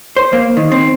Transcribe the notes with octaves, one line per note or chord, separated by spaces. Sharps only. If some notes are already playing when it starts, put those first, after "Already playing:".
C5
A#3
D#3
C4